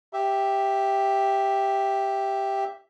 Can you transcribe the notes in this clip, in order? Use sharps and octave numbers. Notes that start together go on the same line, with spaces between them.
G4 E5